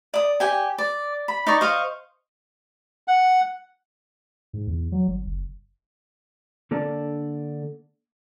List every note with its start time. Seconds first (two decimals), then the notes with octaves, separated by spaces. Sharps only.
0.14 D5 D#6
0.40 G4 G5 G#5
0.78 D5
1.28 B5
1.47 D#4 D5 C#6
1.61 C5 D#5 F5 C#6
3.08 F#5
4.53 G#2
4.67 E2
4.92 F#3
5.08 G1
5.27 F#1
6.71 D3 A#3 D4 A4 D5 A5